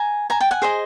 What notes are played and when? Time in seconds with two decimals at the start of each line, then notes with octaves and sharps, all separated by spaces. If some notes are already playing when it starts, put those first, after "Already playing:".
Already playing: G#5 A#5
0.30 G#5 A#5
0.41 G5 A5
0.51 F#5 G#5
0.62 G#4 C5 D#5